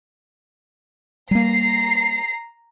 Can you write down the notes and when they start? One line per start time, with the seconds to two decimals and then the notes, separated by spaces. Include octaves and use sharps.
1.31 G3 A#3 A#5 C7